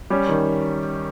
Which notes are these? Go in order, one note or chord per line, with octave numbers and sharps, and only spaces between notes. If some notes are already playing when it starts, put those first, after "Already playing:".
G3 C#4
D#3